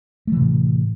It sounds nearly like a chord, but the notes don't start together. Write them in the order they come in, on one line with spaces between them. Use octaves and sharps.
A3 E3 C3 A2